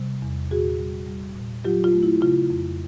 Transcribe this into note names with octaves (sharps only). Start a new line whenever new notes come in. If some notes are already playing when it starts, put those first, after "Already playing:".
Already playing: C3 G3
E2
A#2 F#4 G#4
G3
G3
A#2
F#3 F4 G4
F4
A3
E4
C#3 F4
F2